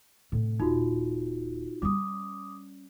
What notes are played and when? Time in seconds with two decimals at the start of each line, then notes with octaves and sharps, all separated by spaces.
0.32 A2 C3
0.60 D#1 D#4 F4 F#4
1.82 G3 C#4 D6 D#6